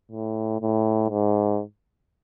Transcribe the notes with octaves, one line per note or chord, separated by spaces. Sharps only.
A2
A2
G#2